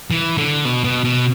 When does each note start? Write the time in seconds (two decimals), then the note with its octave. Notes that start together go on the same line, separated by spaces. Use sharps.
0.11 E3
0.38 D3
0.65 B2
0.84 B2
1.04 B2